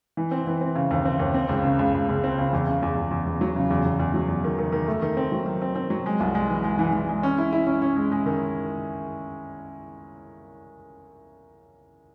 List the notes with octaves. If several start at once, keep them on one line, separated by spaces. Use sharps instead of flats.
E3
C4
E3
C4
C#3
D#2
C4
D#2
C4
C#2
C#3
C#2
C#2
C#2
C4
C#3
E2
C#3
E2
E2
E2
E2
F#3
C#3
E2
E2
E2
F#3
E2
D#3
D#3
D#3
A3
D#3
C4
F#3
D#3
C4
C4
F#3
G#3
C2
G#3
E3
G#3
E3
E3
G#3
C#4
E4
E4
C#4
C#4
G#3
G#3
D#3